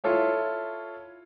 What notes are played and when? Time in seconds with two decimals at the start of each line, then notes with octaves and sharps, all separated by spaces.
0.04 E4 F4 A4 C#5 E5